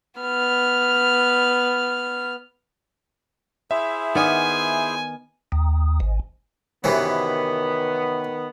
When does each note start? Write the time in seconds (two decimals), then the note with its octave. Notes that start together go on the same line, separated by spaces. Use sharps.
0.20 B3 F6
3.71 E4 G#4 C5 E5
4.15 D#3 B3 D5 G#5
5.52 D#2
6.00 G#1
6.84 F#2 C3 D#3 E3 B3